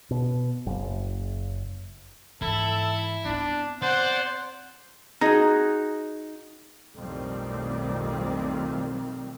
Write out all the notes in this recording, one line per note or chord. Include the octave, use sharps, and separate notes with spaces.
B2
F#1
G#2 E3 E4 A4
B3 C4 D4
C5 D5 F#5
D#4 F#4 G#4
B1 F2 A2 D#3 G3 C4